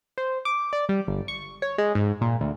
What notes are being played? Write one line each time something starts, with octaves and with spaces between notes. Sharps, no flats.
C5
D6
D5
G3
G1
C#6
C#5
G#3
G#2
A#2
D2